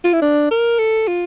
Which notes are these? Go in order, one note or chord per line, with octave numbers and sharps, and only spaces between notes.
F4
E4
D4
A#4
A4
F4